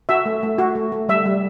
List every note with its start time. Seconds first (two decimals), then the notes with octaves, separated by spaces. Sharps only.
0.09 F#4 E5
0.26 A3
0.43 A3
0.58 F#4
0.75 A3
0.92 A3
1.09 G3 E5
1.25 G3